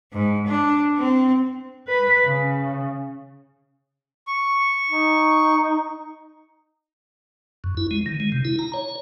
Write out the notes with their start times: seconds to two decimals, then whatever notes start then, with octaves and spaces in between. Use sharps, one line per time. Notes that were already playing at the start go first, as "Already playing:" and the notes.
0.13 G#2
0.47 D4
0.98 C4
1.88 B4
2.25 C#3
4.27 C#6
4.90 D#4
7.64 F#2
7.77 E4
7.91 G#3
8.06 D#3
8.20 G#3
8.32 C3
8.45 E4
8.59 A#5
8.74 C#5